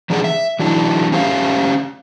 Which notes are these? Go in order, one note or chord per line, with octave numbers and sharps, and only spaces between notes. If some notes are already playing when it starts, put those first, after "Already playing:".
E3 G3 D4 G#4 D5 F#5
E5
E3 F#3 D4 E4
C#4 G4 C5 E5 F5